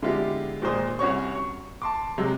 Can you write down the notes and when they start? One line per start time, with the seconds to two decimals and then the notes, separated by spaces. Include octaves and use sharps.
0.02 D3 G#3 B3 E4 F4 G4
0.62 D#2 A#2 G#3 C5 D#6
0.99 C2 C#4 F#4 C#5 C#6
1.35 C#6
1.82 A5 C6 D6
2.18 C3 F#3 G#3